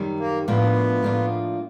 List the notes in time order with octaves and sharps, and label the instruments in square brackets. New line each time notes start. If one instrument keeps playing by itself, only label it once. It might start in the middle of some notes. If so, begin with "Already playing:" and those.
Already playing: [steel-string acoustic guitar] F#2 D#3 G3
[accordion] A#3
[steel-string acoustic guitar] A2 F3 A#3 D4 F4 [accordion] B3
[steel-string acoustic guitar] A2 F3 A#3 D4 F4